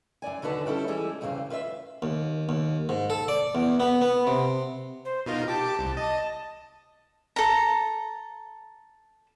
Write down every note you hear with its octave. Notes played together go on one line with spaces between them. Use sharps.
F#2 C#3 D5 G#5
D#2 D3 F#4 B4 A5
G3 C#4 E4 A4
E3 G3 G#3 G#4 A4
E2 G2 C#3 A3 C4 C#4
F4 B4 C5 E5
D#2
D#2
G#2
A4
D5
E2
B3
B3
C3
C5
B2 D#4 F4 A#4
G4 A5 D6
C2
D#5 A5
A4 A#5